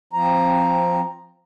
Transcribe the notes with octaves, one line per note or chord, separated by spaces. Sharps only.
F3 C4 A#5